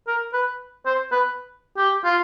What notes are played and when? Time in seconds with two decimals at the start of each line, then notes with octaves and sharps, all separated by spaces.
0.08 A#4
0.33 B4
0.86 C5
1.12 B4
1.77 G4
2.05 F4